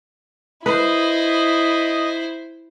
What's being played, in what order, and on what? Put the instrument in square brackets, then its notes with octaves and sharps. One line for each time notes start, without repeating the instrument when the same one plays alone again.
[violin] E4 [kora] B4 [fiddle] C5 [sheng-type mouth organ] D#5 D#6